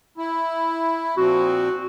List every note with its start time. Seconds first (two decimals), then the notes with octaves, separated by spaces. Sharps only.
0.18 E4
1.17 A#2 F3 C4 F#4